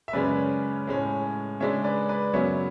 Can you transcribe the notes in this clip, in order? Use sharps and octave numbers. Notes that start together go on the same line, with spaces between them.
E5
F#2 C#3 G#3 C#4 B4 D5
A2 G#3 C#4
C#3 G#3 D4 C#5 E5
B4 D5
B4 D5
F#2 C#3 F#3 B3 C#5 E5